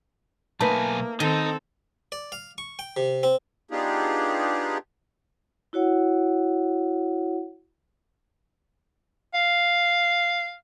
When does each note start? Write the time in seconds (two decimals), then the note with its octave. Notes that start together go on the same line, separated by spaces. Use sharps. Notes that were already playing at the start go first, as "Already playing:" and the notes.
0.61 B1 A3 A#3 D#4 B4 G#5 A5
1.20 D#3 C4 D#4 A4
2.12 D5
2.32 F5
2.58 C#6
2.79 G5
2.97 C3
3.23 C4
3.71 B3 D4 D#4 F4 G4 G#4
5.73 E4 F#4 C#5 F#5
9.34 F5